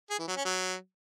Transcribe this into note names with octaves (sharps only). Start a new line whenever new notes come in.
G#4
E3
F#3
C#4
F#3